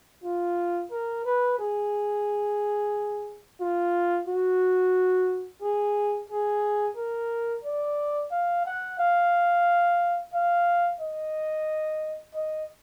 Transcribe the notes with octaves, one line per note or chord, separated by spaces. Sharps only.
F4
A#4
B4
G#4
F4
F#4
G#4
G#4
A#4
D5
F5
F#5
F5
F5
D#5
D#5